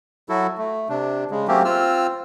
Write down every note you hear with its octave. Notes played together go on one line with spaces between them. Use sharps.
F#3 E4 F#4 A4
A3
C3 D4
C#3 G#3
F#3 A3 A#3 C4 C#4 G4
C4 F4 E6 F6